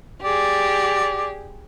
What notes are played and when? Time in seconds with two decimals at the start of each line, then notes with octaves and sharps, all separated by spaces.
0.23 G4 G#4 D5